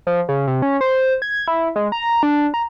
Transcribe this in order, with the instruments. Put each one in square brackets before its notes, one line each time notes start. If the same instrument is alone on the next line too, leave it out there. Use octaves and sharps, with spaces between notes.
[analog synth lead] F3
C#3
C3
C#4
C5
G#6
E4
G#3
A#5
D4
A#5